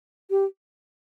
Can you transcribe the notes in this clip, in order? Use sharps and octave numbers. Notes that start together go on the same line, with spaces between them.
G4